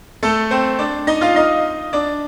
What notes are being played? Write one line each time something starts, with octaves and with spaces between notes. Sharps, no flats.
A3 A4
C4 C5
D4 D5
D#4 D#5
F4 F5
D#4 D#5
D4 D5